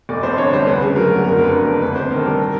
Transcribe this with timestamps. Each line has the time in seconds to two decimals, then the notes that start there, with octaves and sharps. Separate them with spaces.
0.09 F1 D5
0.23 F2 C5
0.38 D3 C#5
0.53 G3 C5
0.66 D2 B4
0.82 C#3
0.96 F#3 A#4
1.10 D2
1.24 F#1 A#4
1.38 F2
1.44 B4
1.53 D3 A#4
1.67 F#1
1.82 D2 B4
1.96 C3 C5
2.11 D#3 A#4
2.18 A4
2.26 G3 A#4
2.39 A#4